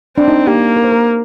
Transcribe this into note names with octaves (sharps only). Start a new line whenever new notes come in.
C4 D4
D#4
A#3 G4
A#4
C5
A#4